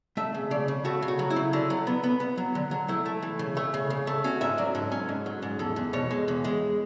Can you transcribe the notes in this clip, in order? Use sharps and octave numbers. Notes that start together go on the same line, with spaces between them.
A3 E5
C#3
C#3 D5
C#3
A3 F#4
C#3
F#4
F#3
E4
C#3
D3
F#3
B3
B3
B3
F#3
D3
F#3
A3 E4
A3
E3
C#3
A3
C#3
C#3
A3
C#4 F#4
G#2 E5
F#3 D5
G#2 A4
C#4
G#2
F#3
G#2
E2 A4
E2
B2 C#5
G#3
E2
G#3